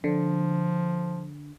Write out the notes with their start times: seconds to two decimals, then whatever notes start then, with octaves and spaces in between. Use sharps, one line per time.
0.04 D3 F3